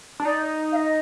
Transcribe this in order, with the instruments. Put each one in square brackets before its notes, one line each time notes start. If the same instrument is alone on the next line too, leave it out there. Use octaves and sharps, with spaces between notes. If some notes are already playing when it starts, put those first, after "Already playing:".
[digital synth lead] D4
[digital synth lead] D#4 [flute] D5
[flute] F5
D#5